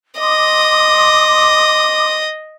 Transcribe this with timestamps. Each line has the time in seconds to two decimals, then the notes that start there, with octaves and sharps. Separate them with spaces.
0.19 D#5 C6 D6 D#6